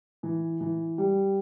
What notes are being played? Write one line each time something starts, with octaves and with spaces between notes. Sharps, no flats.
E3
E3
G3